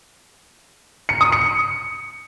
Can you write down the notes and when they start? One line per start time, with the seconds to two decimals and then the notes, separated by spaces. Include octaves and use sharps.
1.09 C#7
1.21 D#6
1.32 C#7